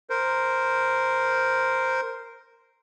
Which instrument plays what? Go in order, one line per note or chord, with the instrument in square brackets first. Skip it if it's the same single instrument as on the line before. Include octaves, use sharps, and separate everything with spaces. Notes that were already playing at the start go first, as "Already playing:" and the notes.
[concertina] A#4 C5